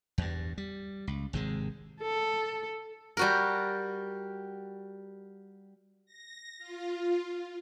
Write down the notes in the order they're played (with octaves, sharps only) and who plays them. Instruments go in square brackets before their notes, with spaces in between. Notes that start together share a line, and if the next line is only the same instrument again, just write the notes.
[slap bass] E2 G2
G3
C#2
G#1 C3 G#3
[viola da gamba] A4
[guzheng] G3 F#4 A#4
[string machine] A#6
F4